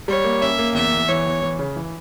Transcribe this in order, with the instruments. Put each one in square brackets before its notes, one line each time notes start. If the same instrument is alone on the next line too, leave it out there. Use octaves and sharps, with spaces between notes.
[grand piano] G3 [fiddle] C#5
[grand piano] A#3
[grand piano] C#4 [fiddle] E5
[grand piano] A#3
[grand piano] E2 [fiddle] E5
[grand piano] E2
[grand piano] E3 [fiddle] C#5
[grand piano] E2
E3
C#3
E3